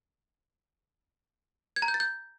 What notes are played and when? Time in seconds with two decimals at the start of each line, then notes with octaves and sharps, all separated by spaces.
1.76 G#6
1.82 A#5
1.88 G6
1.94 A6
2.00 G6